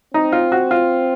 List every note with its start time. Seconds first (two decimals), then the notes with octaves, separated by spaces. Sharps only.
0.14 C4 D#4
0.32 F4
0.52 F#4
0.71 F4